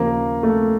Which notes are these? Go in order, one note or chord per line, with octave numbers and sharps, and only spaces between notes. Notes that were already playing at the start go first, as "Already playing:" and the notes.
Already playing: D#2 C#3 F3 A#3
A3